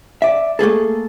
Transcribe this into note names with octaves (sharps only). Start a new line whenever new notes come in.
D5 E5
A3 A#3 G#4 A4